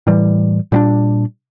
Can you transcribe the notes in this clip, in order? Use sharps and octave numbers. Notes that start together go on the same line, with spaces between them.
A2 E3 G3
A#2 G3 B3 D4